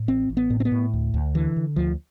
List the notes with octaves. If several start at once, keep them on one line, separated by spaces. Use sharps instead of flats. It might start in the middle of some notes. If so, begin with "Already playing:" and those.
Already playing: A2
A1 C4
A1
B3
A2
C4
B3
A2
D2
D2
D3 E3
D3
D2 F3